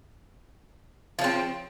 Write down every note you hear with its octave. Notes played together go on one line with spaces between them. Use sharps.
C#3 F3 C4